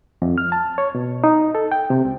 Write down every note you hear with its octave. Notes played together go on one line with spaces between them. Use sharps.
F2
F6
A5
C#5
B2
D#4
A4
G5
C3
C#2